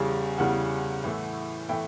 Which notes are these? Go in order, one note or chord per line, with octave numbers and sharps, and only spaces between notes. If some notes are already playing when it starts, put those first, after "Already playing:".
Already playing: E2 C#3 G3
E2 C#3 G3 F#5
A2 E3 A3
A2 E3 A3 G5